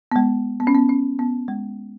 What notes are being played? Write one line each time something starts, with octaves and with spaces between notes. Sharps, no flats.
B3
G#3
B3
C#4
B3
C#4
B3
G#3